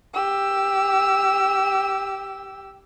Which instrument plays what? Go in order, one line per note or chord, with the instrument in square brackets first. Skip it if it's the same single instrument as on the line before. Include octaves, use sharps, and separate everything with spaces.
[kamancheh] G4 E6